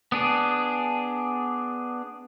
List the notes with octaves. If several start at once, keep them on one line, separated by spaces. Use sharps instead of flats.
B3 D4 G#4